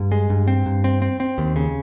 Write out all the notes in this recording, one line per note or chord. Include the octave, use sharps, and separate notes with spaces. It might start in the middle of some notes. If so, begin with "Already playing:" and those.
Already playing: G2
G#3
G2
C4
G2
C4
C4
C4
D#2
C#3